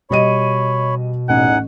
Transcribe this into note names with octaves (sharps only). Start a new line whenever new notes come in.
B2 G3 C#5 D#5 B5 C#6 D#7
A1 E2 D#4 F#5 G#5